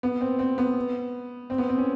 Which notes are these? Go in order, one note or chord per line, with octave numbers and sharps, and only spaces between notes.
B3
C4
C4
B3
C4
B3
C4
C#4